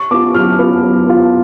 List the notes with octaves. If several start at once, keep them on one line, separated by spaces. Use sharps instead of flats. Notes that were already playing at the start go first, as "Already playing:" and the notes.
Already playing: C#6
B3 F4 D6
F#3 F6
B3 F4
F#3
B3 F4